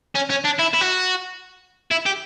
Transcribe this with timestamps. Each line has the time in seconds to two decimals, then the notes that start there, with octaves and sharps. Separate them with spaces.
0.15 C#4
0.30 C#4
0.44 D4
0.59 E4
0.73 E4
0.81 F#4
1.91 E4
2.06 G4